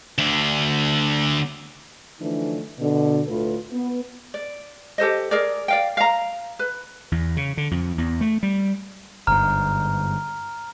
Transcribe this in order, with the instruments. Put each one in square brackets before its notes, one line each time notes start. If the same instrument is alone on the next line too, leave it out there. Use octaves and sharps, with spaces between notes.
[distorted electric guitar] D2 D3
[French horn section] D3 E3 F3 A3 D4 D#4
B2 D3
D2 A2 A3 F4 B4
B3
[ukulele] D5
G4 A4 C5 D#5
G#4 A#4 D5
D5 F5 G5
F5 A#5
B4
[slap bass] E2
C#3
D3
F2
E2
A3
G3
[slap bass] G1 G#2 [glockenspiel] A#5 F6